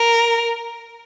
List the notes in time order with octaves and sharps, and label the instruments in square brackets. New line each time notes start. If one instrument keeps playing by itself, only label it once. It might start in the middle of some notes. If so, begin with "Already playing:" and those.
Already playing: [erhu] A#4